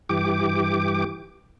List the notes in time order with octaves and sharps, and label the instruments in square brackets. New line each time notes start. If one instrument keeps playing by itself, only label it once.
[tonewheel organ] G2 E3 G4 D6